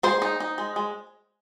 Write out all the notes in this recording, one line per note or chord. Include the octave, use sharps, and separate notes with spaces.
G#3 C5
D#4
D#4
G#3
G#3